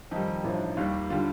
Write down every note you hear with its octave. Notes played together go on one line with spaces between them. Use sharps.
F2 D#3 G3 D#4
A1 G2 F3
D#2 D#3 G3
D3 G3 F4